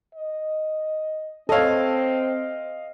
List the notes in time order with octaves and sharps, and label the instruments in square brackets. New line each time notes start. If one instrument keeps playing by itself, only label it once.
[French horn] D#5
[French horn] C4 [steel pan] A4 C#5 [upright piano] D#5 F5